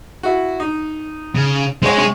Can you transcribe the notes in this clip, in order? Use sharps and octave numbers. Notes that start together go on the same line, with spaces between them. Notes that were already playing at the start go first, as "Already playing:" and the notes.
E4 F#4
D#4
C#3
G#3 C4 G#4 C#5
C3 C#6